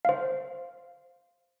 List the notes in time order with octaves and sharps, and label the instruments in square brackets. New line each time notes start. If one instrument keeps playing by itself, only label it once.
[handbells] C5 F5